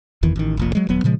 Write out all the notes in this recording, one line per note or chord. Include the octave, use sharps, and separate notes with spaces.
F#1 E2 D#3 E3
A1 D#3
F1 A#1 A#2
F#3 G#3
D#1 F#3 B3
A#2 C#3 F3 G#3